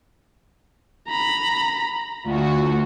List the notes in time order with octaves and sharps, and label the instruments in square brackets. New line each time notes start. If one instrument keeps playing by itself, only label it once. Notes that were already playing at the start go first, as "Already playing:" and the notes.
[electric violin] A#5 B5
[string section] D2 F#4 [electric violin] F4